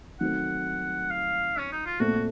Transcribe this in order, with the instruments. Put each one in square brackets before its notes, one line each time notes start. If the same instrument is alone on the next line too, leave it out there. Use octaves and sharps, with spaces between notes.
[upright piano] D#3 F#3 A3 C4 [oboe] F#5
[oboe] F5
C#4
D#4
F4
[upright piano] A#2 A3 C4 [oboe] F#4